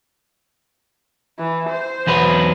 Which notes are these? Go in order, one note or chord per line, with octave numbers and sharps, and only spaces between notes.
E3
C5
E2 F#3 B4